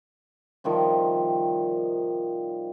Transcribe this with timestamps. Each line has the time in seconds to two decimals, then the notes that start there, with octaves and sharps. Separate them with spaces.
0.64 C3 D#3 F3 G3